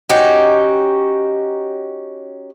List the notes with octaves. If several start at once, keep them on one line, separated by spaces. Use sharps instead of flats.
C#4 D#4 F#4 G4